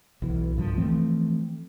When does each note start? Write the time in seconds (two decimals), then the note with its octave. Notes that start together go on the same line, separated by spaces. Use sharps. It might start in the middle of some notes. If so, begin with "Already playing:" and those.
0.22 B1 E3
0.56 C2 G2 F3
0.78 E3 F3 A3 C4